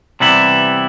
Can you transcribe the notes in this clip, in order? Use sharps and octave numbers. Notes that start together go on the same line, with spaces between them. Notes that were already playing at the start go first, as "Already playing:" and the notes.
C3 E3 G3 B3 E4